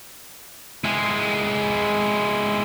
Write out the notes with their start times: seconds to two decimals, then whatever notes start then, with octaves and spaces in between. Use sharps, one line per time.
0.84 G#3 E4